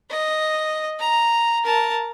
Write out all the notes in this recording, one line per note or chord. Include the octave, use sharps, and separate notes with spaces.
D#5
A#5
A#4 A5